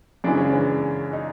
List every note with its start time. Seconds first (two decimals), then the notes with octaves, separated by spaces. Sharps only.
0.24 F#2 C#3 E3 G#3 D4
0.37 C#4
0.49 D4
1.13 D#4